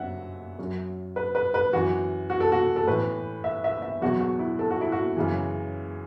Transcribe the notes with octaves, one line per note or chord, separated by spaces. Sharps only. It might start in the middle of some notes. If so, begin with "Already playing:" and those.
Already playing: F#2 F#3 E5 F#5
F#2 F#3
B4
B4
B4
F#2 E3 F#4
F#4
A4
F#4
A4
A2 E3 B4
E5
E5
E5
E2 B2 F#3 F#4
F#4
E4
A4
F#4
E4
F#4
F#2 C#3 E3